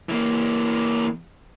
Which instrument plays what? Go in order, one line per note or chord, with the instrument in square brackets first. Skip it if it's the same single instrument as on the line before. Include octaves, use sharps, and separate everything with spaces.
[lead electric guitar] E3 A#3